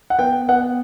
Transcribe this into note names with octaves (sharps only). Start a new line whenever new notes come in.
F#5
B3 G5
B3 F#5